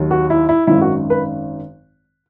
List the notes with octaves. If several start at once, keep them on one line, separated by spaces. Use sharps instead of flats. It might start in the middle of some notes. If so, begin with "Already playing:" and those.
Already playing: D#2 D#3 F#3
F#4
E4
E4
G#1 F#2 D#3 E4
F#4
B4